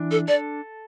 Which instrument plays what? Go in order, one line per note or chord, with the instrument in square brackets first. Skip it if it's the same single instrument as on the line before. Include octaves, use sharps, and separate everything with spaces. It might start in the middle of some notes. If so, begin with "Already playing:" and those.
Already playing: [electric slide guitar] E3 D4
[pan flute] A4
[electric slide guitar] A4 [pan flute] D5